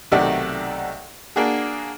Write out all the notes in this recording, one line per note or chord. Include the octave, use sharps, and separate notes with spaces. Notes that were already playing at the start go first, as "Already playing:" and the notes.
B1 C3 D#3 A3 F#4 D5
A#3 D4 F#4 G#4